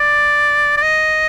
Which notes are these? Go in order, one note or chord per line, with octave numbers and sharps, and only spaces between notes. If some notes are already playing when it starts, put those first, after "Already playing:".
Already playing: D5
D5
D#5